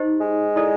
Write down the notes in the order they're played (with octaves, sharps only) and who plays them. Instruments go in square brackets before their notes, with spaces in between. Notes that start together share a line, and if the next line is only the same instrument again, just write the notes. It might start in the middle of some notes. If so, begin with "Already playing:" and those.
Already playing: [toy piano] D#4 G4 C5 D#5
[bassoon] G#3
[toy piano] E4 A4 D5